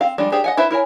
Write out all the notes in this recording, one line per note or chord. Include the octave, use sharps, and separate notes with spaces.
C4 F5
F3 G3 G#3 D4
D4 G4 G#4 C5
D#5 F#5 G#5
E4 B4 C5 E5
E4 A#4 C#5 G#5